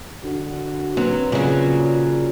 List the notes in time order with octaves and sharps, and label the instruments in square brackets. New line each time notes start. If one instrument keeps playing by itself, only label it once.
[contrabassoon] D3 [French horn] F#4
[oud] F#3 [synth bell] A#3 C4 [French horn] B4
[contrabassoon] A#2 [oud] C#3 F#3 [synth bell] D5